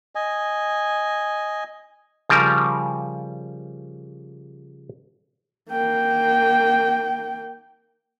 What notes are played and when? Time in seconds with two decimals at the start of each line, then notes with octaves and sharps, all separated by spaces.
0.15 D#5 G#5
2.29 C#3 F3 G3 A#4
5.70 A#3 G5